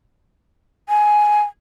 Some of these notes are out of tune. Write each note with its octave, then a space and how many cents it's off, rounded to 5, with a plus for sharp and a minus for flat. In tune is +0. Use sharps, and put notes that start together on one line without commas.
G#5 +10